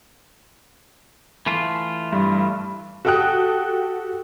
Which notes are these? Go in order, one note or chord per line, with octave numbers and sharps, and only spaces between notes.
E3 A3 F4
G2
F#4 G4 A4 G5 D#6 F#6